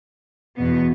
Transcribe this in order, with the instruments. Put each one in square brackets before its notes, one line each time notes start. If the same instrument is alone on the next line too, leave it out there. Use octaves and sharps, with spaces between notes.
[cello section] E2 B2 B3